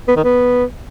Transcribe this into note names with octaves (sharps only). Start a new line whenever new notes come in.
B3
D#3
B3